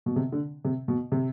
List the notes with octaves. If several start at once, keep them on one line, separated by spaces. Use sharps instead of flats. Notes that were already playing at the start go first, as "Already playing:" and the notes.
B2
C3
D3
C3
B2
C3